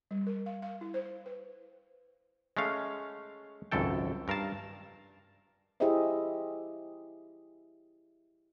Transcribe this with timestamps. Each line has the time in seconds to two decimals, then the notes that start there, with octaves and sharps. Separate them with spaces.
0.11 G3
0.27 A#4
0.46 F5
0.62 F5
0.81 E4
0.94 C5
1.26 B4
2.57 G#3 A3 C#4 F5
3.72 G#1 C#2 F#2 A4 G5
4.28 G2 A#4 F5 A5
5.80 E4 G4 G#4 C5 D#5 E5